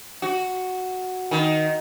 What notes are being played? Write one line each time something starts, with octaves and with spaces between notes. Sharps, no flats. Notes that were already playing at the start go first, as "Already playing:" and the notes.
F#4
D#3